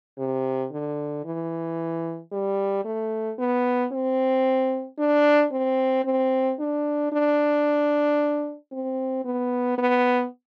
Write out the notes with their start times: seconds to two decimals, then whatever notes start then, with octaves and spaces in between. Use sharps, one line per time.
0.18 C3
0.72 D3
1.25 E3
2.32 G3
2.85 A3
3.39 B3
3.92 C4
4.98 D4
5.52 C4
6.05 C4
6.59 D4
7.12 D4
8.72 C4
9.25 B3
9.78 B3